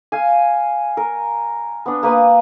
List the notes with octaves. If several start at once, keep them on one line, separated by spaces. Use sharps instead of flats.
F5 G#5
A#4
B3 D4
A#3 B4 G#5 D#6